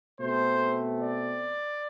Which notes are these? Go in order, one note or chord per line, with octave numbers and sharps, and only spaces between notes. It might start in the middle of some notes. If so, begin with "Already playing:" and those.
B2 A3 C4 C5
D5